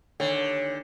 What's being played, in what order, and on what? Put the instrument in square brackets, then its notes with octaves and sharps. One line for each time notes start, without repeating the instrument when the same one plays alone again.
[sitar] D#2 D3 [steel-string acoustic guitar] C#5